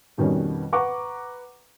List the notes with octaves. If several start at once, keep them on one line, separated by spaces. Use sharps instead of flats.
F2 B2 D#3 G3 C#4
B4 F#5 A#5 C#6 D6